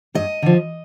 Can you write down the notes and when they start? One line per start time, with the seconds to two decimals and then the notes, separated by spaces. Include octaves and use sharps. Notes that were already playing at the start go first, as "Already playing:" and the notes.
0.15 G2 D#5
0.42 D3 F3